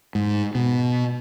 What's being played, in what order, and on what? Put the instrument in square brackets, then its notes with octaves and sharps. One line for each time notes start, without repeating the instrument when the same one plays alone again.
[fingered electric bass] G#2
B2